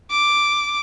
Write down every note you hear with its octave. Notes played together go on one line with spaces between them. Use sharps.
D6